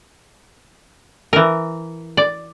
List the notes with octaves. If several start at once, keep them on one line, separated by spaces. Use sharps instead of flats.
E3 A#4
D5